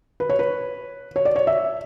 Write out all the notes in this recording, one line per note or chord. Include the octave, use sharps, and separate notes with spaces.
B4
C#5
B4
C#5
D5
C#5
E5